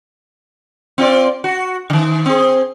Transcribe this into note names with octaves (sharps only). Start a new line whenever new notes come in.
C4 F4 D5
F#4
D3 D#3
C4 G#4